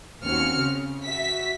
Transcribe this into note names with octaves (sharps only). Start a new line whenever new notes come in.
D#2 C4 C#4 F#4 F6 C#7
C#3
F#4 E5 B6